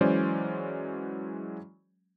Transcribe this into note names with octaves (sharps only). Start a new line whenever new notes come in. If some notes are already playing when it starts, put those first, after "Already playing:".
E3 F#3 G#3 C#4 C5 D5